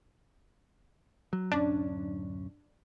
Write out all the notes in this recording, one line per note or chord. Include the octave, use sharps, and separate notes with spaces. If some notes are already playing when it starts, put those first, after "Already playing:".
F#3
D1 F#2 C#4 D4